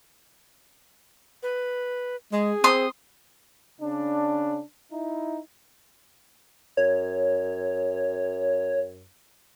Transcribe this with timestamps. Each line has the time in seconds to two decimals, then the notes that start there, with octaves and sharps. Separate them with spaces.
1.43 B4
2.32 G#3 G#4
2.64 C4 C6 D#6
3.81 C#3 D4
4.93 D#4 E4
6.77 F#2 C#5